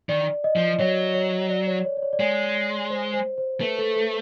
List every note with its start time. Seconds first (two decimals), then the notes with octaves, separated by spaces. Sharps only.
0.09 D#3 D5
0.44 D#5
0.56 F3
0.80 F#3 C#5
1.14 C#5
1.50 D5
1.67 C#5
1.85 C#5
1.97 D5
2.03 C#5
2.13 D5
2.20 G#3 C#5
2.90 C5
3.14 C5
3.38 C5
3.60 A3 B4
3.78 A4
3.96 A4